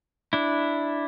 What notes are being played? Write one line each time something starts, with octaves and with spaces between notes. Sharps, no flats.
D4 E4